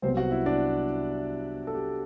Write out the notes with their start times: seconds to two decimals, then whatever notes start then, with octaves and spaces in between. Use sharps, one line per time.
0.02 C2 C3 F#3 B3 C4 C5
0.17 F#4 F#5
0.31 E4 E5
0.46 D4 D5
1.67 A4
1.75 G4